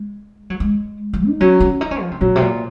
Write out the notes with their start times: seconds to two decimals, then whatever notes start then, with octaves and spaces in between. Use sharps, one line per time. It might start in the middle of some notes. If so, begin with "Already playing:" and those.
Already playing: G#3
0.50 F#3
0.60 G#3
1.13 F3
1.27 D#4
1.41 F#3 C#4
1.60 C#4
1.81 D#4
1.91 C#4
2.01 F3
2.11 C3
2.21 A#2 F#3
2.36 C3
2.41 A#2